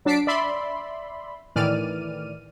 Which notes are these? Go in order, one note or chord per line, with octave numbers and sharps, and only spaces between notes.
F#3 D4 A5 B6 C7 D7
D5 E5 B5 C6
A2 D#3 E3 D5 F6 D#7